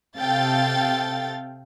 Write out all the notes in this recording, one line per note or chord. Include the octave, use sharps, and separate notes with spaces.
C3 A4 F5 G5 A6